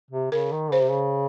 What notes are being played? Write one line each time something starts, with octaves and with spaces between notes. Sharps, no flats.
C3
C#3 A#4
D#3
C#3 C5
C3
C#3